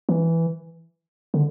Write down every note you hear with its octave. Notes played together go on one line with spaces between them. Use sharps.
E3
D3